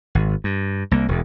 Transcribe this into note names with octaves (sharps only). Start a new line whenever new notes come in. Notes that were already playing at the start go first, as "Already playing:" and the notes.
G#1
G2
C2 A#3
E1 E2